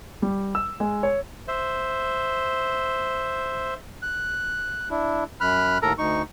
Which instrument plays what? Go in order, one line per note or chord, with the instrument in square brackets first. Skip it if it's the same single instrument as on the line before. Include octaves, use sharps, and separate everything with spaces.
[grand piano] G3
E6
G#3
C#5
[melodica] C5 E5
[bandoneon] F#6
D4 E4
F#2 B5 F6 F#6
D#2 A2 A4 A#4 A#5
D2 D#4 C#6